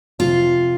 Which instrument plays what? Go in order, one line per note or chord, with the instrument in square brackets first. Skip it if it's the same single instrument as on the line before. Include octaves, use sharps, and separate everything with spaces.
[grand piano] F2 C3 F3 C4 [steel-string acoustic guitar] F4